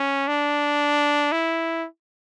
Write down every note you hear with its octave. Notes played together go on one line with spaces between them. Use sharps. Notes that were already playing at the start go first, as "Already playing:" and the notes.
Already playing: C#4
D4
E4